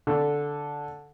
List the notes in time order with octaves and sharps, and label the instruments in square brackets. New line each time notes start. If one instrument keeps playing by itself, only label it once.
[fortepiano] D3